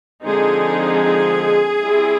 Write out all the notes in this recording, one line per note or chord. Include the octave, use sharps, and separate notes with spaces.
D3 F3 G#3 C4 D#4 G#4
G3 C4 E4